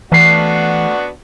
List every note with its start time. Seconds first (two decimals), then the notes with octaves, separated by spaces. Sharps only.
0.12 E3 A3 B3 D4 F#4 F5